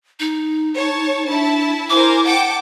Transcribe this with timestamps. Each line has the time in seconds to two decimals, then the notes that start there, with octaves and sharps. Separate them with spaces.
0.20 D#4
0.73 C#5 A5
1.24 D4 E4 A5
1.90 E4 A#4 C5 G#5 D6
2.25 F#5 G5 A5 D6